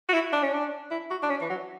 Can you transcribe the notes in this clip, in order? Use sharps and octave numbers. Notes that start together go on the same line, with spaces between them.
F#4
E4
D4
C#4
D4
E4
F#4
D4
C#4
E3
F#3